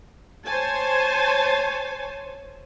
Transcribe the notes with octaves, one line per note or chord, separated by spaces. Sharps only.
C5 C#5 G#5 A5